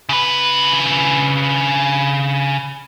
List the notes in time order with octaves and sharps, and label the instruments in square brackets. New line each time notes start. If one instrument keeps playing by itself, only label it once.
[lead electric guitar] C#3 B4